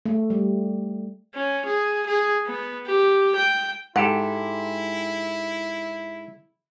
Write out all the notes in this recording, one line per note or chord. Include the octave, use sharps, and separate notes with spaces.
A3
G3
C#4
G#4
G#4
B3
G4
G5
G#2 E4 G4 A4 F#5